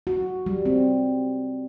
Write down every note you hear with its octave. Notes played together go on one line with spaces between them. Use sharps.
F#4
G3
C4